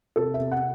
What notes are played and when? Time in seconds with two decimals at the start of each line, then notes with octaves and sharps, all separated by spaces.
0.16 C3 A4
0.34 E5
0.40 C3
0.51 F#5